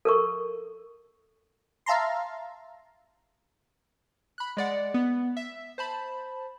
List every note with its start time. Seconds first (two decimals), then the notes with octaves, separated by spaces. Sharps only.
0.05 A4 A#4 C#6
1.86 E5 F5 A5 A#5 C6
4.38 B5 F#6
4.57 G#3 D5 F#5
4.94 B3
5.37 E5
5.78 C5 A5 B5